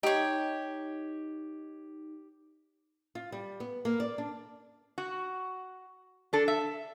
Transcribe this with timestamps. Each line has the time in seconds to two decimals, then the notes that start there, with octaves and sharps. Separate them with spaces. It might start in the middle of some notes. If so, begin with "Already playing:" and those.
0.03 D#4 G4 C#5
3.15 F4
3.32 G3
3.60 B3
3.85 A#3
4.00 D5
4.18 D4
4.98 F#4
6.33 D4 A4
6.48 E5